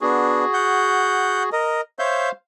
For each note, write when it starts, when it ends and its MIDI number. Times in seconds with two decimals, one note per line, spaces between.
0.01 0.44 59
0.01 0.44 62
0.01 1.49 66
0.01 1.49 68
0.53 1.43 78
0.53 1.43 91
1.53 1.81 70
1.53 1.81 75
1.99 2.31 72
1.99 2.29 73
1.99 2.29 76
1.99 2.31 77
1.99 2.29 91